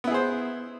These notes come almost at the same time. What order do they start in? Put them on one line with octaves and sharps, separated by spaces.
B3 E4 G#4 C5